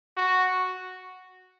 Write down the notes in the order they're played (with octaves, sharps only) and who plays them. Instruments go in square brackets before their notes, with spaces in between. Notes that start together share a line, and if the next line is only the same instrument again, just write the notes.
[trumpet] F#4